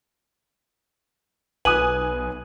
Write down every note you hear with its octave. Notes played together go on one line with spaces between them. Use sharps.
B1 B4 G#5 D#6 F#6 D#7 F#7